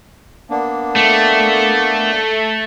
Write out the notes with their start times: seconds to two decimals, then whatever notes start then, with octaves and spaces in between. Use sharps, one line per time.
0.50 A#3 B3 D4
0.96 A3